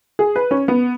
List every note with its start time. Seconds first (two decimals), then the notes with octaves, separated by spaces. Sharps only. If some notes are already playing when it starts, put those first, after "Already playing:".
0.19 G#4
0.36 B4
0.51 C#4
0.68 B3